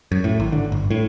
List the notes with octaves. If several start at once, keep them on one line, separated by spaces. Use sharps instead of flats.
F#2
A2
G#1
D3
G1
A2